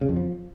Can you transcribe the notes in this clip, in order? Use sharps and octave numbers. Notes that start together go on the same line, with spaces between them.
C#3
F2
F3